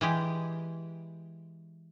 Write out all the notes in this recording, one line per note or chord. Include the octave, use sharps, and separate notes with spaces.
E3 G#3 G4